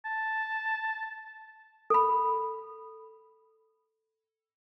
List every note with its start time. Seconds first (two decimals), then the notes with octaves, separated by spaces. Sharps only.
0.05 A5
1.90 A4 B5